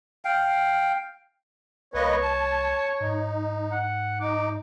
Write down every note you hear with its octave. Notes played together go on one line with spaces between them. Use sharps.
F5 G5
C2 A#3 B4 C#5 D#5
A5
G#2 D#4
F#5
D#4 D6